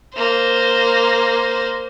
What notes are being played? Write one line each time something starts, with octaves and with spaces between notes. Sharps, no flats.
A#3 C5